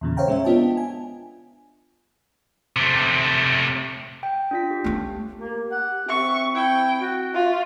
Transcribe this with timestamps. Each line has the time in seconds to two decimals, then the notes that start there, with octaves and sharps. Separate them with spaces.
0.01 E2 A#2 C#3
0.17 C5 C#5 E5 F5 G5 A#5
0.28 G#3 C#4 E5
0.44 B3 D4 F4 D#5 G5 A5
0.77 G#5
2.76 C3 A3
4.23 G5
4.51 D4 F4 B6
4.71 G4
4.84 A3 C#4
5.39 A#3 G4
5.71 F#5
6.09 C4 E5 C#6
6.55 E4 G5
7.01 F#4
7.34 F4 E5